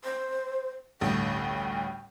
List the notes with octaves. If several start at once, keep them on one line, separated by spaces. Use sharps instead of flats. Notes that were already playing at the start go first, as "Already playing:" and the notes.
C5
A1 D2 G2 G5